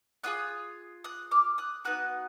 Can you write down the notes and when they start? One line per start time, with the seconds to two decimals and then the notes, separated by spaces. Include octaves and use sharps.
0.24 B3 F4 G#4 D#6 F#6
1.04 D#6 F#6
1.31 D6 F6
1.58 D#6 F#6
1.85 B3 D#4 F#4 D#6 F#6